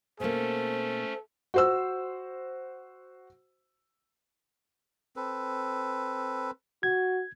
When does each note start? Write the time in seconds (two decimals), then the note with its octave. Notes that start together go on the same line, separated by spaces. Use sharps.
0.20 B2 A3 A#3 C#4 A4 C5
1.54 F#4 C5 E6
5.16 C4 A4 B4
6.83 F#4 G#6